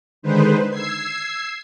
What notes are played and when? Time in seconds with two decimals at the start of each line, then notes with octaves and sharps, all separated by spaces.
0.22 D3 D#3 G#3 D#4 B4 C5
0.69 E6 G#6 C7